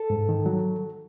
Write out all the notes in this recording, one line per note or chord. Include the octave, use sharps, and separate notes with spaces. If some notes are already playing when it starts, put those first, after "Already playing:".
Already playing: A4
G#2
D#3
F#3